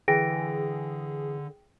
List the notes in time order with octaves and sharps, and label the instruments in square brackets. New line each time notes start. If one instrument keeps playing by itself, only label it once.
[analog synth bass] D3 [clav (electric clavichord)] E3 [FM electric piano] G#4 [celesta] G5 A#6 D7